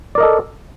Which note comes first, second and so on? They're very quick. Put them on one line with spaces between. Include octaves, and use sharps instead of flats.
D5 A#4 D#5 A4